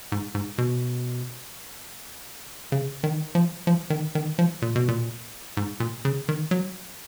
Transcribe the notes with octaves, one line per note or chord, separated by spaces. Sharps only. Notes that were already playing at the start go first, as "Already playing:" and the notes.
G#2
G#2
B2
C#3
D#3
F3
F3
D#3
D#3
F3
A#2
B2
A#2
G#2
A#2
C#3
D#3
F#3